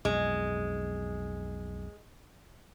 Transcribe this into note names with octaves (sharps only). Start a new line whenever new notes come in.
B1 F2 G#3